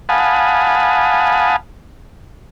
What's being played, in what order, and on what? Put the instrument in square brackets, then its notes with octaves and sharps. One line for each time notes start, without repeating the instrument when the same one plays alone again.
[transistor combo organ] F5 F#5 G#5 A5 B5 D#6